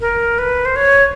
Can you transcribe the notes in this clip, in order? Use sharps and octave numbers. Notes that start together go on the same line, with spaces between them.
A#4
B4
C5
C#5